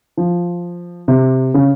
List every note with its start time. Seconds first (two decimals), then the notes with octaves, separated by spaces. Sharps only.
0.17 F3
1.08 C3
1.54 C#3